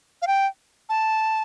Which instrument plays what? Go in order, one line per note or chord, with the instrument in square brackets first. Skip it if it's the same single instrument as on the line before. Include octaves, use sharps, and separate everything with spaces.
[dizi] F5
G5
A5